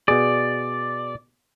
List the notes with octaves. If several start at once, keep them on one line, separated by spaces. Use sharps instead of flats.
B2 G#4 D5